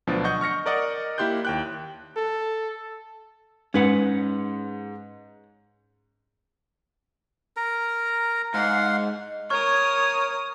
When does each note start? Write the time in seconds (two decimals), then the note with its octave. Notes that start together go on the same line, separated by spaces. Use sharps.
0.07 D2 B2 F3 F#3 D4
0.24 D#5 F#5 C#6 G6
0.41 C#6 F6 A#6 C#7
0.66 A#4 D5 D#5 F#5
1.18 A#3 E4 G4 C6 F#6 G6
1.45 D#2 G5 F#6
2.17 A4
3.74 G#2 C#4 B4 F#5
7.57 A#4 A#5
8.54 G#2 F5 F#5 C6
9.50 A#4 C#5 C#6 D#6 F6 G#6